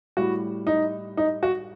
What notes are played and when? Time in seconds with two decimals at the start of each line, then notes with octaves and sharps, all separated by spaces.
0.17 A2 G3 F#4
0.67 D#4
1.17 D#4
1.43 F#4